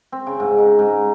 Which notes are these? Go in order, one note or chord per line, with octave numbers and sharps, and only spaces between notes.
C4
C#3
G#2
D#4
G#2